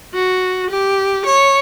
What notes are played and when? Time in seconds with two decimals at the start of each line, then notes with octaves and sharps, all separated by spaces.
0.14 F#4
0.70 G4
1.26 C#5